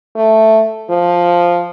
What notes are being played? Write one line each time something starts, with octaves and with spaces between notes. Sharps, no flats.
A3
F3